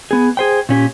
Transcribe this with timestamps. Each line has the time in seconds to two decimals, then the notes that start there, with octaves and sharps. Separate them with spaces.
0.11 B3 G#4
0.37 G#4 C5 G5
0.69 A#2 C#4 G4